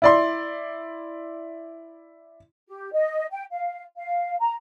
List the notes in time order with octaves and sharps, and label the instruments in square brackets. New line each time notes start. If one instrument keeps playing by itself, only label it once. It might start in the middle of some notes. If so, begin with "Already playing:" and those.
[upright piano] E4 D5 C6
[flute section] G4
D#5
G5
F5
F5
A#5